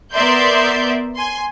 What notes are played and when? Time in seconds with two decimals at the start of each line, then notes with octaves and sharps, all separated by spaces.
0.12 B3 A#4 D5 E5 C6 G6
1.16 G#5 C6